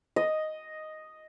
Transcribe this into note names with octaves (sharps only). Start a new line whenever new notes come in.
D#5